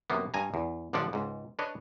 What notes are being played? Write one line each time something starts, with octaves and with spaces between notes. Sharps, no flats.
F#2 C3 A#3 B3
G2 G#5 A#5
E2
A1 D3 F3 D4 D5 F#5
C#2 G#2
D4 B4 C#5 D#5